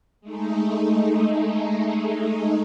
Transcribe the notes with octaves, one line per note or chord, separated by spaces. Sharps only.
G#3 A3 D#4